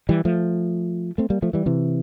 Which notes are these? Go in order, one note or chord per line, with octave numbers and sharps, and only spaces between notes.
E3 G3
F3 A3
A3 C4
G3 A#3
F3 A3
E3 G3
C3 E3